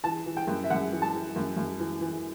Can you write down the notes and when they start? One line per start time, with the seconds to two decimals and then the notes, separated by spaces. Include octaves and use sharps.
0.04 E3 A5
0.26 E3
0.37 G5
0.47 F#2
0.64 E5
0.70 F#2 F#5
0.92 E3
1.02 A5
1.13 E3
1.36 F#2
1.57 F#2
1.80 E3
2.01 E3